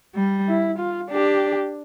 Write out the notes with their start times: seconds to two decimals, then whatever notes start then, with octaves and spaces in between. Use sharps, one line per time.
0.16 G3
0.48 E4
0.79 F4
1.11 D4 G4